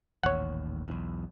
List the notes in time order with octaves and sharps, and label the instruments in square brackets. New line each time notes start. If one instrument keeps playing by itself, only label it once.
[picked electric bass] D#1 A1 D#2 [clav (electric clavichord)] C#5 F#5
[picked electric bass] B1 E2